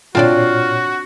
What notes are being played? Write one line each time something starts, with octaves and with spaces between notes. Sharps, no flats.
A#2 C4 D4 F4 F#4 C#5 D5